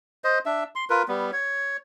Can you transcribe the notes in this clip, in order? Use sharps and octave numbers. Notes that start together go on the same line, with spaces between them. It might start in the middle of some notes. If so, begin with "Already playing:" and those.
C5 D#5
D4 E5
C6
F4 A#4 B4
G3 B3
C#5